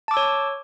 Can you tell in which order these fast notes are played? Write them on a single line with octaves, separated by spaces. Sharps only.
A5 D6 E6 C#5